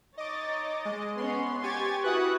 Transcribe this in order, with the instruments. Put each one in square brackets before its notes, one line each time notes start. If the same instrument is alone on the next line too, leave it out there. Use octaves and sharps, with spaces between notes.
[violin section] D#4 C#5 A6 [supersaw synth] D#5 D6
[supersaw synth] G#3 D#5
[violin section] B3 C#4 [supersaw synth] C6
[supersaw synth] G4 G#5 A6 [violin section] C#6 G#6
[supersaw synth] E4 F#4 B4 [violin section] C#6 D#6 F#6